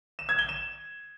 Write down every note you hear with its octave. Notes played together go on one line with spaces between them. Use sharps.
E7
G#6
G7
E7